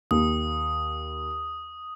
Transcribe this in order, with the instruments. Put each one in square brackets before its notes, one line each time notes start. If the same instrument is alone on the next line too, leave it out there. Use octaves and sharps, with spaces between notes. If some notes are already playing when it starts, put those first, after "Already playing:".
[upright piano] D#2 [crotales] D#6